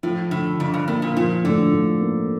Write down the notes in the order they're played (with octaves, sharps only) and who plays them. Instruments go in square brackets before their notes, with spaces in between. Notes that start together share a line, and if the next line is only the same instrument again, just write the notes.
[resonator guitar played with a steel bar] A2 [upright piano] F3
[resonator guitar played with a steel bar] A2 [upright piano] D3
[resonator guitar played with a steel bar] F2 [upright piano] D3
[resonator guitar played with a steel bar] G2
[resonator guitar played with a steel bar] A2 [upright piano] A#3
[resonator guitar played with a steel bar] A#2
[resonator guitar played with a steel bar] A#2 [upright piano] F3
[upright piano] A2 [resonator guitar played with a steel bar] D3
[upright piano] A2
A#3